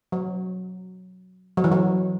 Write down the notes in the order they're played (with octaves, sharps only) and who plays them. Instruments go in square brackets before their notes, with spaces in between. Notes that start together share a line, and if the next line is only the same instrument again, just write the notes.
[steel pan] F#3
F#3
E3
F#3